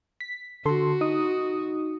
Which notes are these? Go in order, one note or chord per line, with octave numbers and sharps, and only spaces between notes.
B6
D3 F#4 A4 C6
D#4 D#6